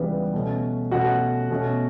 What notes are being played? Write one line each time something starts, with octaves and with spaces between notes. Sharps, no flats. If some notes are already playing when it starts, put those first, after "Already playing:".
Already playing: C#2 C#3 E3 G3 B3 B4
B2 A3 C#4
B2 A3 C#4 F#4 F#5
B2 A3 C#4